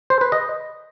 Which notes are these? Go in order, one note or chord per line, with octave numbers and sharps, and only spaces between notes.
C5
B4
D#5